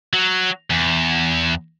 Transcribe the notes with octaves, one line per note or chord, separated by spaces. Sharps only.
F#3
E2